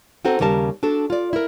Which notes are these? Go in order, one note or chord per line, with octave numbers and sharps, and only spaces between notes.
C4 D#4 F#4 A4 C5
D#2 C#3 G3 A#4 A5
D4 F#4 A4
F4 D5
E4 A#4